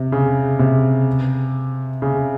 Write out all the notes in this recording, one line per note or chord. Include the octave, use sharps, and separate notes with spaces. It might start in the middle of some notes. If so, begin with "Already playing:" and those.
Already playing: C3
C#3
C3
C#3